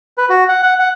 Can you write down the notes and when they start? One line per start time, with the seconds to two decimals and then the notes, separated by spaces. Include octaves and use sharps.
0.18 B4
0.30 F#4
0.49 F#5
0.63 F#5
0.79 F#5